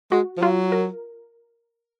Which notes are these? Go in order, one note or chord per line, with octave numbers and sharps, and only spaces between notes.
G#3 F#4
F3
F#3 F4
A#4